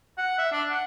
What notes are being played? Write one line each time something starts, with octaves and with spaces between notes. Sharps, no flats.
F#5
E5
D4
F#5